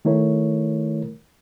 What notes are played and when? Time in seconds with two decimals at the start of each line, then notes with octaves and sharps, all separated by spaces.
0.05 D#3 A3 E4 A#4 C#5